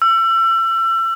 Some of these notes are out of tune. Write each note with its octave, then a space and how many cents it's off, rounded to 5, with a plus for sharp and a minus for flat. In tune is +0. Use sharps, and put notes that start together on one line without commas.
E6 +30